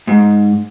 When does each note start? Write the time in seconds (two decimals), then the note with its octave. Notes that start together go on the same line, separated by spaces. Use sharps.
0.07 G#2